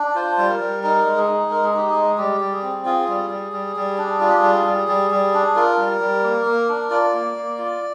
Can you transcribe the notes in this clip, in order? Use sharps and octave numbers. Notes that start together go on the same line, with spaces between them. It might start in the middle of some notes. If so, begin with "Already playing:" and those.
Already playing: D4
F4 C5
G3
A#4
G3
D#4 A#4
G#3
G#4
D#4
G#3 A#4
G#4
D#4 G4
G#4
G#3
G3 G4
G3
G#4
C4
F4 G#4
G3
G3
G3
G3
D4
F4 G#4
G4
G#4
G3
G3
G3
G3
D4
F4 A#4
G3
G3
A#3
A#3
D4
F4 D5
A#3
A#3
F4